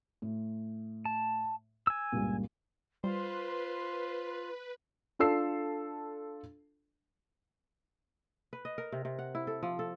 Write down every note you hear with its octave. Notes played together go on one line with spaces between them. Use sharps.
A2
A5
G#5 E6
C#2 G2 A#2
G3 F4 B4 C5
D4 F4 A4 E6 C7
B4
D#5
A#4
C3
C3
F#5
E4
A4
F3
A4